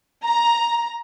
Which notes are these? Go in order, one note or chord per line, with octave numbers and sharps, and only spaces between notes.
A#5